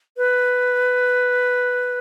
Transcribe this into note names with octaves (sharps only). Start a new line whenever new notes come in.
B4